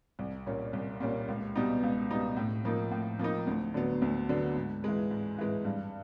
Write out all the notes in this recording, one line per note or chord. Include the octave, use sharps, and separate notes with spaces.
C2
A#2 G3 A#3 C#4
C2
A#2 G3 A#3 C#4
C#2
B2 G3 B3 D#4
C#2
B2 G3 B3 D#4
A2
F3 A#3 D#4
A2
F3 A#3 D#4
D2
D3 F#3 B3
D2
D3 F#3 B3
G#2
E3 G#3
G#2
E3 G#3
G2